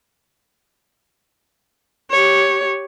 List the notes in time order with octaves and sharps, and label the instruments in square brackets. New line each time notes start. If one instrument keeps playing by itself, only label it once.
[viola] G4 C#5